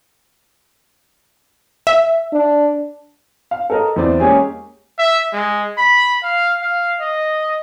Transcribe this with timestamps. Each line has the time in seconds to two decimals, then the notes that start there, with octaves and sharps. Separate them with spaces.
1.87 E5
2.33 D4
3.51 F5
3.70 A4 A#4 D#5
3.96 E2 E3 C4 D5
4.20 G#3 A#3 C#4 G4 G#4
4.99 E5
5.33 G#3
5.78 B5
6.23 F5
6.62 F5
7.00 D#5